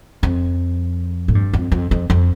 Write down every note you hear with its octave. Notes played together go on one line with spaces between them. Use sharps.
F2
A2
G2
F2
F2
F2
F2